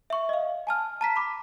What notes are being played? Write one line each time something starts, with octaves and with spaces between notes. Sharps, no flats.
E5 C#6
D#5 F5
G#5 A5 F6
A5 A#5 B6
B5 D6